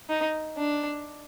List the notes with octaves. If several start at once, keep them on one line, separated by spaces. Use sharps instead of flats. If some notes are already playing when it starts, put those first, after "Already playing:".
D#4
D4